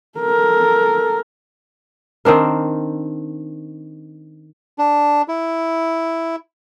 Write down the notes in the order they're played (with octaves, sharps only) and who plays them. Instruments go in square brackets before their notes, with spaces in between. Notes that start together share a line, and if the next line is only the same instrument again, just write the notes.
[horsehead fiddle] A4 A#4
[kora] D#3 C4 D4 A#4
[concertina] D4
E4